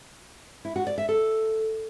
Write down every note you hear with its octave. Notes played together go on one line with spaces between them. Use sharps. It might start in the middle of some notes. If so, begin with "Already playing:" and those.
E4
F#4
D5
E5
A4